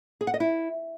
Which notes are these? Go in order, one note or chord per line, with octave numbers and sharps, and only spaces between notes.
G#4
F#5
D#5
E4